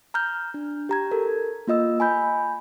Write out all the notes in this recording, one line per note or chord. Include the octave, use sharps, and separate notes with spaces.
A#5 F6 G6
D4
G4 A#5 G#6
A4 A#4
A#3 F4 D#5 E6
G#5 B5 G6